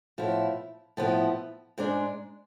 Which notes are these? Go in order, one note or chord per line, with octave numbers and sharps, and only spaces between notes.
A2 F3 B3 E4
A2 F3 B3 E4
G#2 G#3 D4